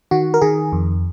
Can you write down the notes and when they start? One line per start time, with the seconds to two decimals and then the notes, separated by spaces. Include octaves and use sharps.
0.11 D#3 F#4
0.34 A#4
0.41 D#3 G#4
0.73 F2